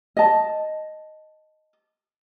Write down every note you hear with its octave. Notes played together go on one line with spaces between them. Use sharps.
D#5 A5